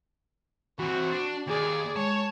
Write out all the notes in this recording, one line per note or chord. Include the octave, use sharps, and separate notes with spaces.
E3 C4 F#4
D4
D#2 G#4 D5
G#3 C#5 A5